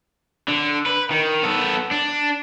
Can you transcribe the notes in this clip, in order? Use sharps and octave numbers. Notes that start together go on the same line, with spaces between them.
D3
B4
D#3
B3 A4
D4